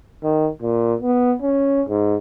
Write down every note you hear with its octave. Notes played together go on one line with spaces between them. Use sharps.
D#3
A#2
B3
C#4
G#2